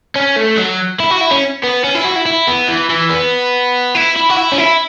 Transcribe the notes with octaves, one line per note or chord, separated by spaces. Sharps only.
C#4
A3
F#3
E4
F#4
E4
C#4
B3
C#4
E4
F#4
E4
E4
B3
E3
E3
B3
E4
E4
F#4
E4
C#4
E4